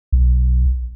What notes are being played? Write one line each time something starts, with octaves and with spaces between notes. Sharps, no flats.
B1